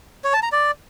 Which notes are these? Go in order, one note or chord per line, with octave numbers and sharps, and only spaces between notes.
C#5
A5
A#5
D5